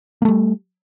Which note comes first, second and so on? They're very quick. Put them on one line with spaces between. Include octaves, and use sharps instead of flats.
A#3 A3 G3